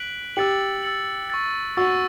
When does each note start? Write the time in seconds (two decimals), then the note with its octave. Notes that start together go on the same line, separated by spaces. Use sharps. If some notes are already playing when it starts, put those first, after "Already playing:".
Already playing: F#6 B6 D7 F#7
0.36 G4 E6 A6 C#7 F#7
0.83 E6 A6 C#7 F#7
1.30 C#6 E6 A6
1.77 F#4 C#6 E6 A6